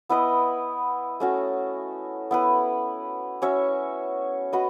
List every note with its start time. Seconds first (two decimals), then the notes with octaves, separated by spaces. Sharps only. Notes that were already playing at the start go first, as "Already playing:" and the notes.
0.09 B3 E4 B4 D#5
1.20 A3 C#4 F#4
2.31 B3 E4 B4
3.42 C#4 F#4 C#5 E5
4.53 F#4 B4 D#5